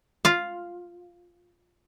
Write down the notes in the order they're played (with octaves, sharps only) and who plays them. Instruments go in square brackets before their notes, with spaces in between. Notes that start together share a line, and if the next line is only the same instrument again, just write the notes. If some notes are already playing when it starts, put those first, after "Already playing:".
[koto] F4 F5